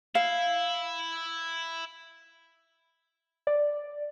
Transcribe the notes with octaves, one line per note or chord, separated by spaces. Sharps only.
E4 F5
D5